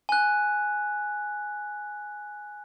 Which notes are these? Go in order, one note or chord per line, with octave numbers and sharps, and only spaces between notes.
G#5 F#6